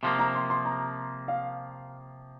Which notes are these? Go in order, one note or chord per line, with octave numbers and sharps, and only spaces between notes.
C3 F3 A#3 C6
A#5
C6
C6
A#5
F5